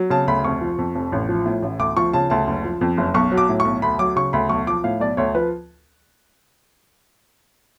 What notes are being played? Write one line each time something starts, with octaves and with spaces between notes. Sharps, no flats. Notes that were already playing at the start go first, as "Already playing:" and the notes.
Already playing: F#3
C#3 A5
D2 B5
F1 C#6
F3
F2
F1
A1
F3
A2
A1
D2 D6
F3 C#6
C#3 A5
D2 A5
F#1
F3
F2
F#1
B1 C#6
F#3
D6
A2
C#6
B1
D2 B5
F#3 D6
C#3 C#6
D2 B5
B1 C#6
F3 D6
A2 F5
B1 D5
D2 C#5
F3 B4